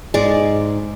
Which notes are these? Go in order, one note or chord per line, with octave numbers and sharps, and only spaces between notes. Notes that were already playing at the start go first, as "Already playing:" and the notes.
G#2 G#3 D5